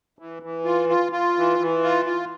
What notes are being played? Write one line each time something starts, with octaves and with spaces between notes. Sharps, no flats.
E3
E3
F4
F4
F4
E3
E3
F4
F4